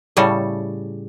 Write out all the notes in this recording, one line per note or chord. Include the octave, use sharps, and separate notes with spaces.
A2 C#3 G3 A4